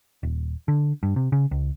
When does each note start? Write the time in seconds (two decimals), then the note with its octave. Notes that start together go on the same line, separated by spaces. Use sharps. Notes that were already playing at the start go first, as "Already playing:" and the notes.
0.23 D#1
0.68 D3
1.03 G2
1.16 C3
1.32 C#3
1.51 C#2